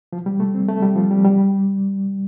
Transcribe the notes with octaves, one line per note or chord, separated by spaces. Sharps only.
F3
G3
A3
C4
A3
G3
F3
G3
G3